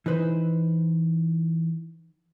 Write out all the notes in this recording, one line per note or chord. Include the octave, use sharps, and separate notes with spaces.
E3 D#4 B4 C5